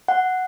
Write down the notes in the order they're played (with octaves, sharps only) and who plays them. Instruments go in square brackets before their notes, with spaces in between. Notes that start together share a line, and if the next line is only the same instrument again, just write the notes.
[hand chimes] F#5